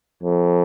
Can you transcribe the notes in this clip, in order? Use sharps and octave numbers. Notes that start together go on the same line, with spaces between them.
F2